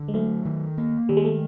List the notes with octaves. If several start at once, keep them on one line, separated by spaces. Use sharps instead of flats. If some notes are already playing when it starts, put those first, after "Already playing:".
Already playing: D3
G#3
F#3 A3
D#3
A#3
D#3 G3
G#3
A3